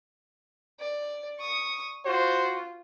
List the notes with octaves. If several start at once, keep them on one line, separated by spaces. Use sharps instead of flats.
D5
C#6 D#6
F4 F#4 C5